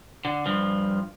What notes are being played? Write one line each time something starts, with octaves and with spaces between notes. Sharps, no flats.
D3
G2 F3